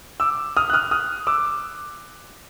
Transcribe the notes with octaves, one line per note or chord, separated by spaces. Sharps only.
D6 E6
D#6 F6
F#6
D#6 F6
D#6 F6
D6 E6